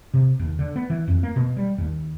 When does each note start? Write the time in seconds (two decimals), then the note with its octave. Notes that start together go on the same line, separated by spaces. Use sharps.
0.14 C3
0.39 D#2
0.59 D3
0.76 B3
0.90 E3
1.08 F2
1.23 A#3
1.36 B2
1.57 G3
1.78 D#2